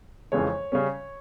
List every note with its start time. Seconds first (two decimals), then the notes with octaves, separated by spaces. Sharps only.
0.32 F2 C#3 E3 G#3 C#5
0.72 C#3 G3 C#4